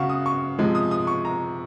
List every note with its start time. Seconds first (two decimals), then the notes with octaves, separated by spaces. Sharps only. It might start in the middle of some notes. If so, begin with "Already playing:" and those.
Already playing: C#3 F#3 F5 F#5 C#6
0.09 D#6
0.26 C#6
0.59 C3 F3 G#3
0.75 D#6
0.91 D#6
1.07 C#6
1.25 A#5